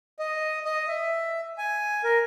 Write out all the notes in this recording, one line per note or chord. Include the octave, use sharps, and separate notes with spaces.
D#5
D#5
E5
G#5
A#4